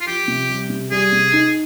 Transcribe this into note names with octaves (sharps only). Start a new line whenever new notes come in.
F4
F3 G4
C3
G3
C3
G3 G#4
C3
D#4